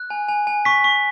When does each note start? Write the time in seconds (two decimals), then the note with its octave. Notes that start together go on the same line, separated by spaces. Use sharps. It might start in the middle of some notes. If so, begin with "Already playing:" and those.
Already playing: F#6
0.10 G#5
0.29 G#5
0.47 G#5
0.65 C#6 B6
0.84 C#6